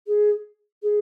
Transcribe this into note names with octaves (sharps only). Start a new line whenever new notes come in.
G#4
G#4